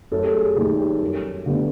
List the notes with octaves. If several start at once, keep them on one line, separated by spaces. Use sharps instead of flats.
F#2 A4
G4
G#4
D#3 G3 A#3 G4
G4
F#2
D3 G3 B3